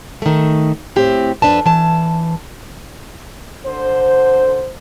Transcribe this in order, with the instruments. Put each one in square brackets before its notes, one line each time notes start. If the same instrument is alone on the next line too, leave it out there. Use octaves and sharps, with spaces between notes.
[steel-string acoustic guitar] D#3 A3
A2 C4 G4
F2 D4 B4 A5
E3 A5
[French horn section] D3 C5